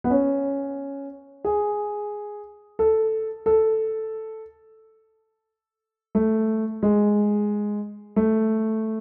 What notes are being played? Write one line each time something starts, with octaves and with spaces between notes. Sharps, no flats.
B3
C#4
G#4
A4
A4
A3
G#3
A3